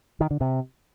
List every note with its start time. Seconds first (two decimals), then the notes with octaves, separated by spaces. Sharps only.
0.21 D#3
0.31 D3
0.41 C3